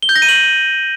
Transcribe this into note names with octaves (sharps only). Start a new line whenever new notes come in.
G7
G6
A#6
D#7
F#7